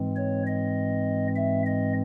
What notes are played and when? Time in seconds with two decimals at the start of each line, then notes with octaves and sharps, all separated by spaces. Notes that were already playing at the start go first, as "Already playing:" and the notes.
Already playing: G#2 E3 G#3 C4
0.16 C#5
0.46 D#5
1.36 E5
1.66 D#5